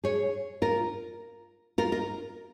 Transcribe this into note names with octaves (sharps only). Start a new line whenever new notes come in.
G#4 C#5
F4 A#4
F4 A#4
F4 A#4